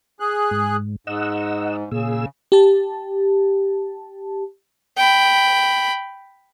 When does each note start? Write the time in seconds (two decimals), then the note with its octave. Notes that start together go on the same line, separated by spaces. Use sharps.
0.20 G#4 F#6
0.51 G#2
1.07 G#2 D#5 F#5 E6
1.91 A#2 C#3 G#4 E6
2.52 G4 A5
4.97 G5 B5